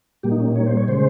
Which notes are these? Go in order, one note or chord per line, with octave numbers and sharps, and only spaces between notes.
A#2 G3 A#3 G4
D#4
C#4
D#4
C#5
C5
C#5
C#3 G#3 C5